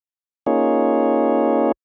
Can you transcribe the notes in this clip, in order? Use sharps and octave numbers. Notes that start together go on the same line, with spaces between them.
A#3 C#4 D#4 F4 G#4 C#5